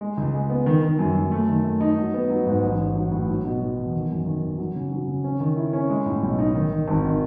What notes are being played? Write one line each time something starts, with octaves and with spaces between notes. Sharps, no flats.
G#3
C#2
G#3
B3
D#3
D#3
F#2
F#2
A3
D#3
A3
D#4
F#3
B3
F#3
G#2
A1
A1
F#3
A2
F#3
B2
F#3
E2
D#3
F#2
D#3
D#3
F#3
C#3
F#3
C#3
C#4
D#3
E4
C#4
G#3
A2
B1
D#4
D#3
D#3
G#1
D#3